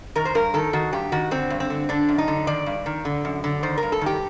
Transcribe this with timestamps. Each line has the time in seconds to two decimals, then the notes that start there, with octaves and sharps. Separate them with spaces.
0.15 D#3 A#4
0.25 C5
0.35 G2 A#4
0.54 D#3 A4
0.73 D#3 F#4
0.93 G2 G4
1.12 D#3 F#4
1.31 D3 C4
1.50 G2
1.60 C4
1.70 D3
1.89 D3 D4
2.09 F#2
2.18 D#4
2.28 D3
2.47 D#3 D5
2.66 G2
2.86 D#3
3.05 D3
3.25 F#2
3.44 D3
3.63 D#3 C5
3.78 A#4
3.83 G2
3.92 A4
4.01 D#3 G4